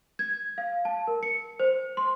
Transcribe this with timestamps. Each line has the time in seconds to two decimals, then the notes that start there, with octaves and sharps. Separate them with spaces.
0.19 G#6
0.58 F5
0.85 A5
1.07 A#4
1.23 C#7
1.60 C5
1.97 C6